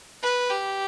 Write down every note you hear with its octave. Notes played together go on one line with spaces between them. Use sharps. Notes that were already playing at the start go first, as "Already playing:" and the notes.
B4
G4